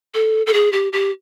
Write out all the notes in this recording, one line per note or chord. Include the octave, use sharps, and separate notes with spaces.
A4
A4
G#4
G4
G4